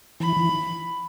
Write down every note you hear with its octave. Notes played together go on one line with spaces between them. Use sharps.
E3 B5
E3